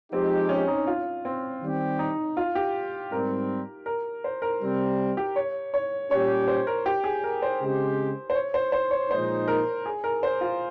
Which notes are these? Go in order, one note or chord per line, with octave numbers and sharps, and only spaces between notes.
F3 G#3 C4 D#4 G4
C#4
D#4
F4
C4
D#3 G3 C4 G4
D#4
F4
G4
G#2 G3 C4 A#4
A#4
C5
A#4
C3 G3 C4
G4
C#5
C#5
A#2 G3 C#4 G4 C#5
C5
A#4
G4
G#4
A#4
C5
C#3 G#3 C4 G4
C5
C#5
C5
C5
C#5
A#2 F3 G#3 D#4 C5
A#4
G#4
A#4
C5
F4